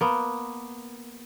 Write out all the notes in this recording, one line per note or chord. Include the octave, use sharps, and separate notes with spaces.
A#3 B3